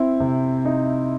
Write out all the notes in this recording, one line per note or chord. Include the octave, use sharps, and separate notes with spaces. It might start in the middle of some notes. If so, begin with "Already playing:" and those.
Already playing: C4 E4
C3
D#4